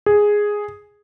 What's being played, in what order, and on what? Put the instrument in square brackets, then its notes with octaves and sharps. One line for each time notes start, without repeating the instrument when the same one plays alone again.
[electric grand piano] G#4